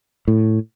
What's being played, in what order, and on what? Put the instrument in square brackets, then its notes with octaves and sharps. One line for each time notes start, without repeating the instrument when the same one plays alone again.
[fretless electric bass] A2